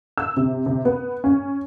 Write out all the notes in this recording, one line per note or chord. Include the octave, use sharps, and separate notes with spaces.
E6
C3
C3
B3
C#4